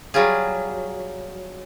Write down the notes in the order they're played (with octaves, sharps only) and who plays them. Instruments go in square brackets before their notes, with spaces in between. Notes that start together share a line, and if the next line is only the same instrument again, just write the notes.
[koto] F#3 G3 F4 G#4